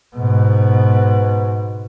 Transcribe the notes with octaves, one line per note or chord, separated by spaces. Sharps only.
G#2 B2